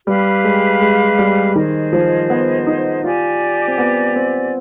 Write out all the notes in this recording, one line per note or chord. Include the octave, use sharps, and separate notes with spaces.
G3 G4 B4 F5 B5
G#3
G#3
G3
D#3 G#4 C5 D#5
F3
B3
D#4
F4 G4 D5 G#5
C4
B3
C4